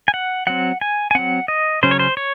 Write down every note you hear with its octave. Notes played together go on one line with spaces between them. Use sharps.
G#5
F#5
F#3 C4 F#5
G#5
G#5
F#3 C4 F#5
D#5
C#3 F#3 C#4 C5
C#5
C5
C#5